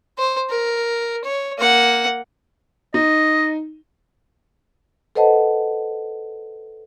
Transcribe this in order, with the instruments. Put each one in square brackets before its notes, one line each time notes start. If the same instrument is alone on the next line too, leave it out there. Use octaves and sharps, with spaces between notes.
[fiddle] C5
A#4
C#5
A#3 F#5
[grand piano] D#4 [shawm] D#5
[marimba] A4 B4 C5 D#5 F#5 A5